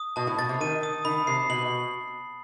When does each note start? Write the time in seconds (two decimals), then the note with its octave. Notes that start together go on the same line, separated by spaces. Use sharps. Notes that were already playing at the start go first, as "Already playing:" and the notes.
Already playing: D#6
0.16 B2 A5
0.27 A2
0.39 B2 A6
0.49 C3
0.60 D#3 D#7
0.83 D#6
1.05 D#3 B5
1.27 C3 C7
1.50 B2 F#7